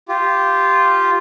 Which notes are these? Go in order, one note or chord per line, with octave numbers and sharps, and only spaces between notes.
F4 G4